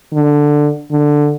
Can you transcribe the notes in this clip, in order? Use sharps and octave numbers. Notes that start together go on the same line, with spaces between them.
D3
D3